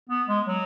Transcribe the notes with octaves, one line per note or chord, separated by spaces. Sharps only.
B3
G#3
F#3